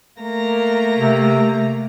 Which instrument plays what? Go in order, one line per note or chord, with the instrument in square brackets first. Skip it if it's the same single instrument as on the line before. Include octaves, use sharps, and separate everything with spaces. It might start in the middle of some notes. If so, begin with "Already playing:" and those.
[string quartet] A3 A#3 A#5
[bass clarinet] C3